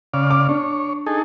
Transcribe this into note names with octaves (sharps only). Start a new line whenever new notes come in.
C#3 D5 F5
D6
D4 C#5
D#4 G#4 A4